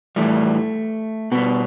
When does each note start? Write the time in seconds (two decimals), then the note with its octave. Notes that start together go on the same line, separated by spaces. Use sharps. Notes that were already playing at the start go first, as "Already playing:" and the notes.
0.16 A2 E3 G3 A3
1.32 B2 G3 B3